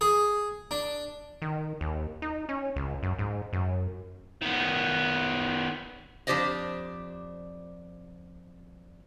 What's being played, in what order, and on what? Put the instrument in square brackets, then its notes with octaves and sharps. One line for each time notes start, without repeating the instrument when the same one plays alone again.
[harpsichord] G#4
D4
[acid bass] D#3
D#2
D#4
C#4
C#2
F#2
G#2
F#2
[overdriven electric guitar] D#3 B3
[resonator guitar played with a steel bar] F2 D4 G4 C5 D5 D#5